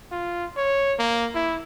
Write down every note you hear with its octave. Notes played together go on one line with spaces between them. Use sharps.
F4
C#5
A#3
E4